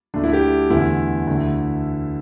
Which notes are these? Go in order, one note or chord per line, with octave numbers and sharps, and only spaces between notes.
D2 D3 A3 D4
E4
G4
E2 D3 A3 E4
D2 D3 A3